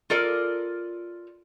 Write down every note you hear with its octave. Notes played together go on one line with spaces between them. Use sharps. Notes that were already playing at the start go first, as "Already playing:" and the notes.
F4 A4 A#4 D5